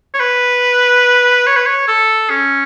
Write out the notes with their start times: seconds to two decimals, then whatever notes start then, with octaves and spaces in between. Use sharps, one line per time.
0.14 C#5
0.20 B4
1.47 C#5
1.57 B4
1.66 C#5
1.88 A4
2.30 C#4